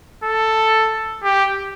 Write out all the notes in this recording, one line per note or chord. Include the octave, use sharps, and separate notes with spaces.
A4
G4